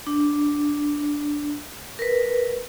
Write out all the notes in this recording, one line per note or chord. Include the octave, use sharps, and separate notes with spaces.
D4
A#4 B4